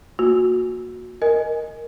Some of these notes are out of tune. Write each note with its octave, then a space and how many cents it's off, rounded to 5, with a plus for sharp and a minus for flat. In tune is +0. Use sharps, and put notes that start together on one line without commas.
A#3 +0 F#4 -20
A#4 +0 D#5 +0 G#5 +0